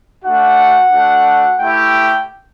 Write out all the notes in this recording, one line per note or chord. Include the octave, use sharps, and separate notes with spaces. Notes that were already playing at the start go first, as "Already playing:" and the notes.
A3 D4 F#4 F#5
A3 D4 F#4
A3 E4 G4 G5